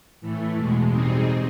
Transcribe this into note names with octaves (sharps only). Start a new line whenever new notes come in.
A2 E3 A3
E2 B2 G#3
B2 G3 C4 D#4 G#4